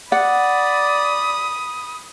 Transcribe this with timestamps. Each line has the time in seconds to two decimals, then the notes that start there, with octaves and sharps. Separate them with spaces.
0.12 D5 F#5 B5 D#6